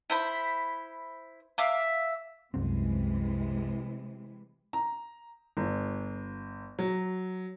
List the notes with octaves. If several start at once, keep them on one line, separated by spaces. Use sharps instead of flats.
E4 C5 B5
E5 F5 D6
C2 F#2 C3 E3 G#3 C4
A#5
G1
F#3